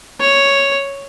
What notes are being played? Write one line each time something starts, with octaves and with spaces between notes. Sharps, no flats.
C#5